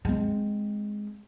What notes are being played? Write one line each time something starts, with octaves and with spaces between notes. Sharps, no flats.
G#3 C4